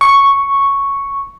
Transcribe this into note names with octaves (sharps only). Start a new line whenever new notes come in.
C#6